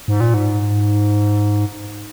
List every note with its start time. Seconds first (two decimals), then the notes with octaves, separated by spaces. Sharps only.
0.08 G#2
0.20 A#2
0.34 G#2